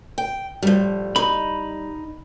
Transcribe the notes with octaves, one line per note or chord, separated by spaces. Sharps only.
G5
A2 F3 G3
D#4 B5